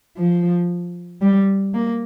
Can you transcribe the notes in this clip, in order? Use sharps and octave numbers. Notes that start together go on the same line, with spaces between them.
F3
G3
A#3